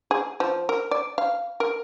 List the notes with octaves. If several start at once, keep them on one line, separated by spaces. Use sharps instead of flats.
G#4
F3
A#4
D5
F5
A#4